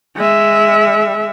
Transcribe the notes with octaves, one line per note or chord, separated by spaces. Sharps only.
G#3 E5